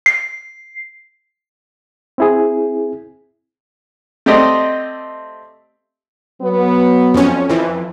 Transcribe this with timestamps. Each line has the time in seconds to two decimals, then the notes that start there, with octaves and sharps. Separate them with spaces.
0.06 C7
2.18 C4 E4 G#4
4.26 A3 C4 G4 D5 D#5
6.42 F#3 B3
7.14 F2 C#4
7.49 F2 E3